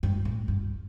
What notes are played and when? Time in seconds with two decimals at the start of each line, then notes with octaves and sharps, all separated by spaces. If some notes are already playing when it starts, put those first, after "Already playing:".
0.03 G2
0.25 A2
0.48 G2